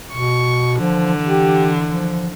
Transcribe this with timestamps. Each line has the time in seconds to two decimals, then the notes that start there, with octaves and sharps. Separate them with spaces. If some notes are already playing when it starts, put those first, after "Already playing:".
0.15 B2 C#6
0.80 D3 E3 F3
1.26 G4
1.86 F3